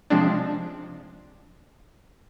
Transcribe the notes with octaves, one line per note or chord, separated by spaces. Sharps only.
C3 F3 G#3 C4 D4